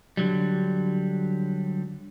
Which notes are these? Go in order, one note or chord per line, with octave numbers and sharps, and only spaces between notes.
D3 F#3 G3